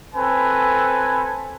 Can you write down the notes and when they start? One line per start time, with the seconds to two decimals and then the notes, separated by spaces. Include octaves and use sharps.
0.14 C4 A4 B4 G#5